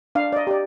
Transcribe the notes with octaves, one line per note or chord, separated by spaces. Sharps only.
D4 F5
D5
D#5
G4 D5